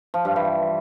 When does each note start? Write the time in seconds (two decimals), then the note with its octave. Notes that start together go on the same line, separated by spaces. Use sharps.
0.14 F3
0.25 G2
0.36 E3